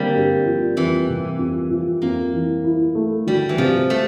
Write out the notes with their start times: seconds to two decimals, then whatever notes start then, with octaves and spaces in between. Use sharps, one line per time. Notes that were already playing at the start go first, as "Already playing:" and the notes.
Already playing: D3 G3 A#3 C4
0.15 G2
0.46 F3
0.76 F2 E3
1.09 C3
1.39 F2
1.70 F3
2.02 F2 A#3
2.33 E3
2.64 E4
2.95 A3
3.27 D2 G3
3.49 E3
3.58 C3 F3
3.90 A3